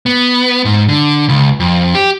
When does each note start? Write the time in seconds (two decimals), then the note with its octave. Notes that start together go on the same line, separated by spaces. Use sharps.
0.06 B3
0.65 G#2
0.89 D3
1.29 C#2
1.60 F2
1.95 G4